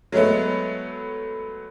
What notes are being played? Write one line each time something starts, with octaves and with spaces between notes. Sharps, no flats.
F#3 G#3 A3 B3